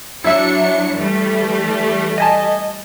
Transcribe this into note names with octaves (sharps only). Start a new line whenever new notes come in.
F#3 D4 E4 E5 C#7
E3 G3 A3
D#5 G#5 A5